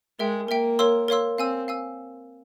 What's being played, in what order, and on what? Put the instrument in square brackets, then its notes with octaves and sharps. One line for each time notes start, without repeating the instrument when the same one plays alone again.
[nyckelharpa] G#3 [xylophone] A#4 E5 G5
[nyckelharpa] A#3 [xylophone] A#4 E5 G5
[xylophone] A#4 C#5 F5 C6 E6
A#4 C#5 F5 C6 E6
[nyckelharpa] C4 [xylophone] F5 G#5 E6
[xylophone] F5 G#5 E6